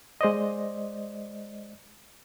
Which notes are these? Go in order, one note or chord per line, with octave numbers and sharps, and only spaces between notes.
G#3 C5 D5 D#5